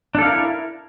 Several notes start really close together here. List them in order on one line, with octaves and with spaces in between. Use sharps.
D4 A4 F5 A#4 E4